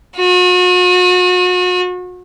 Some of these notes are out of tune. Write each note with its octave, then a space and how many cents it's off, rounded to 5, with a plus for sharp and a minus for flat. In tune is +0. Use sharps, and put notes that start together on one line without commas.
F#4 -40